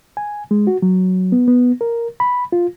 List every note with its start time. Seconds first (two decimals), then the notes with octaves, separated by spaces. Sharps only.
0.17 G#5
0.51 G#3
0.67 F#4
0.82 F#3
1.32 B3
1.47 B3
1.81 A#4
2.20 B5
2.52 F4